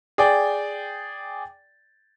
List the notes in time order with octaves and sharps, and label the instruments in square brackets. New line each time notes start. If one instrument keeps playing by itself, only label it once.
[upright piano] G#4 D5 G5